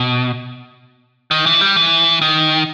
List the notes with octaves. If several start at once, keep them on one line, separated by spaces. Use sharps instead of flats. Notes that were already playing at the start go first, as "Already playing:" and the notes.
Already playing: B2
D#3
E3
G3
E3
D#3